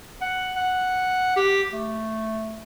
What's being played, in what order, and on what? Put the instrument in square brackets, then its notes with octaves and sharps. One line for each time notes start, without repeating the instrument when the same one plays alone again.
[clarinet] F#5
F#5
G4
A3